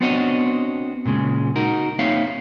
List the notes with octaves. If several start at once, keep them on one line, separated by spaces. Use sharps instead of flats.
B3 C4 D4 F#4 C#5 D#5
A#2 C#3 G#3
D#4 F#4 A#4
A#3 C4 D#4 C#5 E5 F5